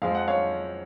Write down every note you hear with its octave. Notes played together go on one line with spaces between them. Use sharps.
F2 F3 G#3 F5
F#5
C#5 F5